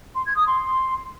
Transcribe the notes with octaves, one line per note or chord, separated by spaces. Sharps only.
C6
G#6
D#6
C6